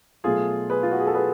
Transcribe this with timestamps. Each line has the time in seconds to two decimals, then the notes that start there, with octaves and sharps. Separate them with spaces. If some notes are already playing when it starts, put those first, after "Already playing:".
0.24 B2 F#3 A3 F4 G#4
0.70 G#4 B4
0.83 F4
0.92 F#4
0.99 G#4
1.07 A4
1.14 G#4 B4